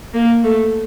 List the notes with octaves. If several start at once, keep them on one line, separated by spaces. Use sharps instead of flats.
A#3
A3